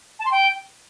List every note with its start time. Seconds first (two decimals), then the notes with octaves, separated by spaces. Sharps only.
0.19 A5
0.25 C6
0.31 G5